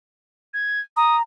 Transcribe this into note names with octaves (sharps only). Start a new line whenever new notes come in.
G#6
A#5 D#6